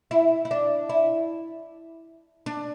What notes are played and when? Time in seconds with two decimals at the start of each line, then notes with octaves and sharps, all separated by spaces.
0.11 E4
0.45 E4
0.51 D4
0.89 E4
2.46 D4